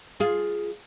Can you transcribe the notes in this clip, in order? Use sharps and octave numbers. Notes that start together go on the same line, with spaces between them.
F4 G#4